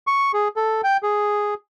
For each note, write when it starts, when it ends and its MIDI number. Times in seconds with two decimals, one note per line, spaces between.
0.07 0.32 85
0.33 0.48 68
0.56 0.81 69
0.84 0.97 79
1.03 1.54 68